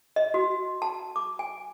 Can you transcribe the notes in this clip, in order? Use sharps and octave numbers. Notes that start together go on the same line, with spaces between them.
D#5
F#4
A5
D6
G#5